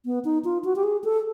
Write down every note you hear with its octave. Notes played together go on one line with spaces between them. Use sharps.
B3
D#4
F4
F#4
G4
G#4
A4